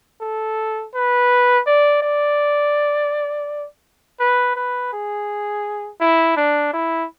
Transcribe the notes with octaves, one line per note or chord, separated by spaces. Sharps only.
A4
B4
D5
D5
B4
B4
G#4
E4
D4
E4